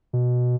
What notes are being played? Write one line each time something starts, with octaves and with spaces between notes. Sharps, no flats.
B2